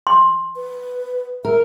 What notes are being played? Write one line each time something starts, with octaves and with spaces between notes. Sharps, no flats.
C6
B4
A#4 E5